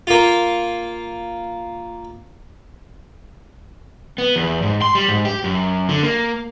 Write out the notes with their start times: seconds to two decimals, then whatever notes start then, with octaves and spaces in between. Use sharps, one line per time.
0.07 A#3 F4
4.18 B3
4.36 E2
4.62 G#2
4.82 C6
4.95 G3
5.08 G#2
5.25 G4
5.44 F#2
5.89 D3
6.03 A#3